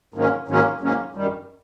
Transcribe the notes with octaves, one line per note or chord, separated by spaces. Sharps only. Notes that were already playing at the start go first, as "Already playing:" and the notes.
G#2 D#3 F#3 A#3 C#4
G#2 D#3 F#3 A#3 C#4
G#2 D#3 F#3 A#3 C#4
F#2 D#3 G3